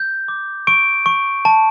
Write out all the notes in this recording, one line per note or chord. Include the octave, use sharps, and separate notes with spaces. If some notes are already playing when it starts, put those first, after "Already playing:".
Already playing: G6
D6
C#6 D7
C#6
A5